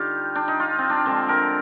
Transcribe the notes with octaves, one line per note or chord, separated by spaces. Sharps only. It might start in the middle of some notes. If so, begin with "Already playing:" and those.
Already playing: D3 G3 D#4 F4 G4
D4
D#4
F4
C4
D4
D3 F3 G#3 C4
A#4